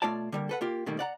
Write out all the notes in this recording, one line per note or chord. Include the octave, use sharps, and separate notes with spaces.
B2 A3 F4 C#5 D5 A5
D3 G3 A#3
A4 B4 F#5
A#3 F4 G4
B2 D#3 G3 A3 A#3
D5 F#5 A#5